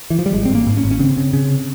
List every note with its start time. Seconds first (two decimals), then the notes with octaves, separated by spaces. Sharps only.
0.10 E3
0.19 F3
0.26 G3
0.33 G#1 G#3
0.45 C4
0.50 G#1
0.55 A#3
0.66 G#2
0.77 C#4
0.83 G#1
0.91 C#4
0.99 C#3 C4
1.17 C#3
1.33 C#3